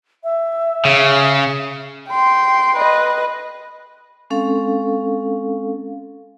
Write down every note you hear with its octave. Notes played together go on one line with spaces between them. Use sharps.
E5
C#3
G5 C6
B4 D#5
G#3 C4 C#4 A4 F5